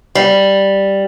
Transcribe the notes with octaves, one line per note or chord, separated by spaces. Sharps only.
G3